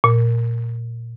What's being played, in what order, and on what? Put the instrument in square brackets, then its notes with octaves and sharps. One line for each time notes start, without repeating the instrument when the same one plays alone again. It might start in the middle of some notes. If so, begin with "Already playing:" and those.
[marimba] A#2